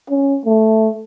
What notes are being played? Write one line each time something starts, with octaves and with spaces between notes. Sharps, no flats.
C#4
A3